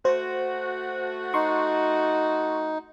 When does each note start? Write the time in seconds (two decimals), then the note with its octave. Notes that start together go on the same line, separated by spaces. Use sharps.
0.05 A3 F#4 C5
1.34 D#4 C6 C#6